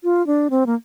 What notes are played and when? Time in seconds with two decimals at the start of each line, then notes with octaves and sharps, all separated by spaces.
0.04 F4
0.27 D4
0.50 C4
0.66 A#3